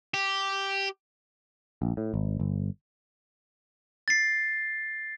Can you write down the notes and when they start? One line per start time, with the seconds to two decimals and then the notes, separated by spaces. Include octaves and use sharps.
0.14 G4
1.82 A#1
1.97 A2
2.14 G#1
2.40 G1
4.08 A6 C7